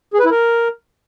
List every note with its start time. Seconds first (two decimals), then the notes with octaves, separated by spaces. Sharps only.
0.14 G#4
0.19 B4
0.25 E4
0.31 A#4